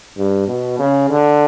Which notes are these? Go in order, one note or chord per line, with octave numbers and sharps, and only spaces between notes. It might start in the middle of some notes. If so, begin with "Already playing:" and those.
G2
B2
C#3
D3